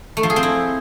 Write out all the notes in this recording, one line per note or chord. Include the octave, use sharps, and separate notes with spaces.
A3
F3
G#4
C4
E4